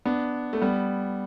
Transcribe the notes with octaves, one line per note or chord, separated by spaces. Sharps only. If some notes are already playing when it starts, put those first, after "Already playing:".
B3 D4
A3
G3 B3